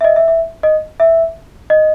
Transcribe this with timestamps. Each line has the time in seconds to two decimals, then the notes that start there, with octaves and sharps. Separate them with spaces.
0.01 E5
0.04 D#5
0.16 E5
0.28 E5
0.63 D#5
1.00 E5
1.70 D#5